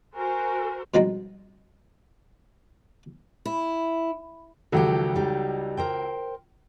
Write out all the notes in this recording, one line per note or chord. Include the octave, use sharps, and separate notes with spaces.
F#4 A#4 C5 G#5
B2 F3 G3 G#3 C4 D#4
E4
C#2 D#3 F3 F#3 G4 A4
G3 D#4
A#4 C5 G5